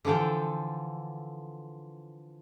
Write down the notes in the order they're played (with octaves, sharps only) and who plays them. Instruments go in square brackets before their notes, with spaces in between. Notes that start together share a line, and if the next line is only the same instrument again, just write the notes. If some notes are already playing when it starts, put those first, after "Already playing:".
[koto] D3 E3 F3 A4 G5